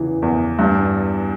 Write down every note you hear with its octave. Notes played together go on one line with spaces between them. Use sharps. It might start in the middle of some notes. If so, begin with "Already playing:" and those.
Already playing: E2 C#3 E3
E2
G2